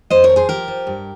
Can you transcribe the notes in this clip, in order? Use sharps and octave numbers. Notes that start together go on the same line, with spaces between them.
F2 C5 D#5
A#4 C#5
F3
G#4 C5
F3 G4 A#4
F3
G2